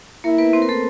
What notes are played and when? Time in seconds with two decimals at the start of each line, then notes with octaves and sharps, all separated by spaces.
0.24 A#3 E4 A#4
0.38 B3 B4
0.53 C4 C5
0.62 A#4
0.69 A3 A4